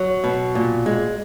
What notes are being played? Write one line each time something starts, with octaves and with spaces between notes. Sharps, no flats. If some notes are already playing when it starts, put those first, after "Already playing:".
Already playing: F#3
B2
A#2
G#3